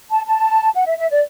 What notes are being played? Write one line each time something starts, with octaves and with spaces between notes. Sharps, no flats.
A5
A5
F#5
E5
E5
D5